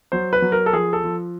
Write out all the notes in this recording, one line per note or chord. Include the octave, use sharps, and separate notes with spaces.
F#3 C5
B4
F#3
A#4
A4
F3 G#4
A4
F3